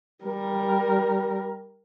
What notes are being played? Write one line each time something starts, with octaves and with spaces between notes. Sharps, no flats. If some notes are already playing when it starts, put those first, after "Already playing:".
G3 A#4